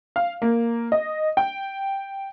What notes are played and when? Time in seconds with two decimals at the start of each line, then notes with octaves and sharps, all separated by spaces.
0.16 F5
0.42 A#3
0.92 D#5
1.37 G5